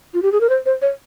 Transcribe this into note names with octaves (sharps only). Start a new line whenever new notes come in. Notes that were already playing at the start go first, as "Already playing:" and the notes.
F4
G4
G#4
A#4
C5
C5
C#5